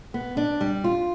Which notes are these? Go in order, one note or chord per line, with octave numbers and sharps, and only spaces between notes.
B3
D4
G3
F4